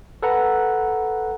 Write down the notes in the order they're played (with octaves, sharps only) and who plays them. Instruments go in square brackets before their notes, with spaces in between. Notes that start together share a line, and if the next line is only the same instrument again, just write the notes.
[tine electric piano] A4 B4 F#5 A#5